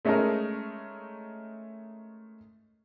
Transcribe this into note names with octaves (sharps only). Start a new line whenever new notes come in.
G#3 A3 C#4 D#4 G#4 A#4